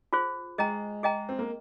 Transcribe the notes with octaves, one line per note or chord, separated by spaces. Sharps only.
F4 G#4 C5
G#3 G#4 D#5 G5 A#5
G#4 D#5 G5 A#5
C4
A#3